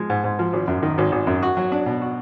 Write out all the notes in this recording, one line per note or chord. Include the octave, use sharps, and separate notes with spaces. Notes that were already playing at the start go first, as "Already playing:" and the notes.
Already playing: F3 G#3
G#2
G#2
F3
G#1
F#2
D#3
G#1
G#1
F#2
F#4
F#3
D4
B2
F#4